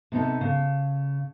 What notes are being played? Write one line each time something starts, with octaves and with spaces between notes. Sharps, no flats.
C3 B3 D#4 A4
C#3